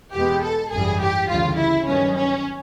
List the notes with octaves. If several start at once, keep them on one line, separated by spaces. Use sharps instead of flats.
E2 B2 G#3 B3 G4
A4
G#1 F#2 C#3 E3 G3 G#4
G4
D2 C#3 E3 G3 F4
E4
G2 D#3 F#3 B3 C#4
C#4